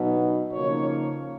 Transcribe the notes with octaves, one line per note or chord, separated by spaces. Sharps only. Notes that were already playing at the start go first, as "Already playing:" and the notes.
Already playing: B2 F#3 B3 D#4
C#3 F3 A#3 D#4 C#5